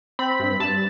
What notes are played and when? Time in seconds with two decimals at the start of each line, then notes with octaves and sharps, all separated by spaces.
0.19 C4 B5
0.40 G2
0.60 G2 A5